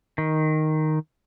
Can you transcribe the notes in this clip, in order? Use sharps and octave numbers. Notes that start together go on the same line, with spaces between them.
D#3